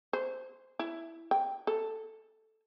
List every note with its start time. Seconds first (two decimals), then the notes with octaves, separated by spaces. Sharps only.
0.13 C5
0.79 E4
1.31 G5
1.67 A4